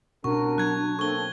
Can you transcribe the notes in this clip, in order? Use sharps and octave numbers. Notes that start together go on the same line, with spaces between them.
C2 B2 C#4 D4 F#4 A#4 C#6
F#3 F#6 G#6
A#3 C4 A4 C#6 G7